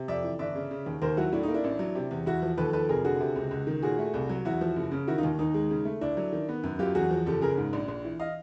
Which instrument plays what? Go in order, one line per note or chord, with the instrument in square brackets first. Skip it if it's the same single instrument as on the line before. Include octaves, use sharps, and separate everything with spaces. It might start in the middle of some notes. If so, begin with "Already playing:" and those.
Already playing: [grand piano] C3
F2 D5 E5
E3
G1 D5 E5
C#3
C#3
D#2
D#2 A#4 C5
F#3 E4 F#4
A2 D4 E4
D#4
A#3
D4 E4
A1
F#3
C3
E2
E2 E4 F#4
F3
D#2 A4 B4
F3 A4 B4
F1 G#4 A#4
D3 F#4 G#4
C3
C#2
C#2
D#3
A#2 F#4 G#4
A3
C2
F#3
E2 E4 F#4
F3
F#1
C#3
D#3 E4 F#4
D#4 F4
D#2
D#2 D#4
G#3
C#3
A3
D2 D4 E4
F#3
D#3
B3
F#2
F#3 F4 G4
E2 F#4 G#4
F3
F#1 G4 A4
C#3 G#4 A#4
G#2
A#1
A#1
E3
D#5 F5